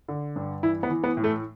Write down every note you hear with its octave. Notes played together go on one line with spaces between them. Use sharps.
D3
G2
E3 E4
B3
E3
B3
A2
A3